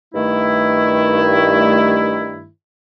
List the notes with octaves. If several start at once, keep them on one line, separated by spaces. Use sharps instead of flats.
G2 D#3 A3 E4